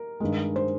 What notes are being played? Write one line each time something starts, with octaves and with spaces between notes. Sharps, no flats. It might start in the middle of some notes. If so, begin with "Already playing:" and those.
Already playing: A#4
G2 D#3 G#3
C5